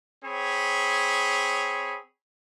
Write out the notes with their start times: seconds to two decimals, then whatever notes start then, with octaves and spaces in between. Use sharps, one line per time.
0.24 C4 G#4 C#5 B5